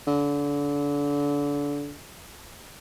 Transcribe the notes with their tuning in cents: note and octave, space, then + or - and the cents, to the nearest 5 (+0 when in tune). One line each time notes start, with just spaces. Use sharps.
D3 -30